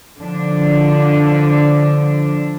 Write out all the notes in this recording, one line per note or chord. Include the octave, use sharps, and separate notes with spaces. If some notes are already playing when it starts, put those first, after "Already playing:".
D3 F3 D4